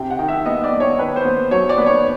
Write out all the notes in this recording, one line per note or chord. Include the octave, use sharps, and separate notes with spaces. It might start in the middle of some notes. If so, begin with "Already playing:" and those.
Already playing: C3 G5
F#5
D#3
E5
B3 D#5
D5
B3
C#5
D#3 B4
C5
B3
F#3 C#5
D5
B3
C#5